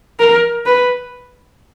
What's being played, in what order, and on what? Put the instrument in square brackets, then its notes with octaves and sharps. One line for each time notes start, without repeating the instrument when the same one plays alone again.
[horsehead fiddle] A#4
B4